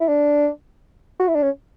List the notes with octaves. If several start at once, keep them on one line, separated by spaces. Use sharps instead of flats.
E4
D4
F#4
E4
D4
C#4